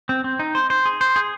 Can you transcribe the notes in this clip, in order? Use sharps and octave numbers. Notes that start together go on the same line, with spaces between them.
C4
C4
D#4
C5
C5
G#4
C5
G#4